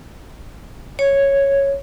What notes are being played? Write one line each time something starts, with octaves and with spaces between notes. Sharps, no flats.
C#5